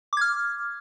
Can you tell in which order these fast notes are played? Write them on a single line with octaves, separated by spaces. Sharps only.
D6 G#6 F6